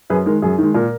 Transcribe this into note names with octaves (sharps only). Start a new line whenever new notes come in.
F#2 G#4 B4
D#3 G#3 A#4
F#2 G#4
D#3 G#3
A#2 A#4